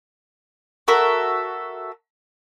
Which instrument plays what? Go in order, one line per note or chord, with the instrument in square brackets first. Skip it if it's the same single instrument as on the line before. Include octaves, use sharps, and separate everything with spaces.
[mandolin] F#4 A4 A#4 E5